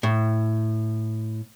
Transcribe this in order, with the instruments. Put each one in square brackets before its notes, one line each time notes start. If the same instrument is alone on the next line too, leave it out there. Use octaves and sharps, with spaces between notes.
[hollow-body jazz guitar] A2